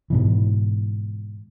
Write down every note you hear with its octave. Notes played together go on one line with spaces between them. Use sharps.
G#2 B2 E3